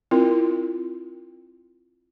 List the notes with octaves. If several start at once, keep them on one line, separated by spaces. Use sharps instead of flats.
C4 E4 F4 A#4